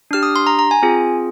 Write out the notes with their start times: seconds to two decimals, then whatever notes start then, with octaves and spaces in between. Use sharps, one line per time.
0.11 D4 G4 F6
0.23 D#6
0.36 C6
0.47 A#5
0.59 A#5
0.71 G#5
0.82 C4 F4 G#4